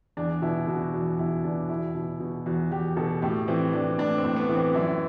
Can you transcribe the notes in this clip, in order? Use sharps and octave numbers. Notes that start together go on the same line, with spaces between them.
E2 D4
B2 E4
B2 F#4
E2 F#4
E2 E4
B2 D4
E2 E4
B2
B2
E2 F#4
E2 G4
B2 A4
A2 G4
E3 C4
E3 D4
A2 D4
C4
A2
B3
E3
C4
F#2 E4